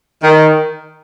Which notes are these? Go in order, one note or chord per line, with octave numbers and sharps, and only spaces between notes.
D#3